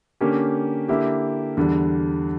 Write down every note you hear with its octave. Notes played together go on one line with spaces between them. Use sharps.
D3 A#3 C#4 G4
D3 A#3 E4 G4
E2 D3 G3